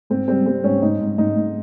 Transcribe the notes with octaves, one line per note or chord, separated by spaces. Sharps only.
G#2 C4
G3 C4
G3 C4
G#2 C#4
G#2 D#4
G#2
G#2 D#4
G#2